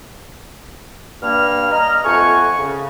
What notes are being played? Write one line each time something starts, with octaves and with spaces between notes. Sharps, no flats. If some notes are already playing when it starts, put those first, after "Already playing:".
G2 A#3 F6
D#5 A#5 F6
F2 A3 F#5 G#5 C#6
C#3